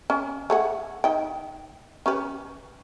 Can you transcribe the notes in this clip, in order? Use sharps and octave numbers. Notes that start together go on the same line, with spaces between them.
C#4
A3 G#4 F#5
D#4 G5
C#4 G4 B4